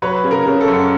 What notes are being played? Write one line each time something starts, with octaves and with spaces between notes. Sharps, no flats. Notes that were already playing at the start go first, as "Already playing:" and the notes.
F#3 B4 C#5
C#3
A#4
C#3
A4
F#2